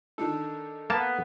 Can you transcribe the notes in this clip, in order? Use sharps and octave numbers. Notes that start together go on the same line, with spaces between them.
D#3 D4 D#4 A4
A#3 B3 A5